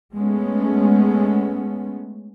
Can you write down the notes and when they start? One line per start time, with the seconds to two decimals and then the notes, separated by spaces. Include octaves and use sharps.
0.14 G#3 A3 B3 C#4